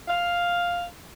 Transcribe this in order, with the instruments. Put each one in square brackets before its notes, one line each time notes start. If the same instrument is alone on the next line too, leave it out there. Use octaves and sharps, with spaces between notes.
[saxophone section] F5